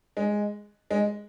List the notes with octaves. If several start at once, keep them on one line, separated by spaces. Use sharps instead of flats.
G#3
G#3